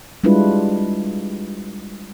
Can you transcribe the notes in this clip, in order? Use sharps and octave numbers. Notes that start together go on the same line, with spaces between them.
G3 G#3 D4 E4 F4 B4